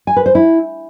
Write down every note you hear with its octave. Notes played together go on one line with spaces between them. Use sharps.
G#5
B4
C5
E4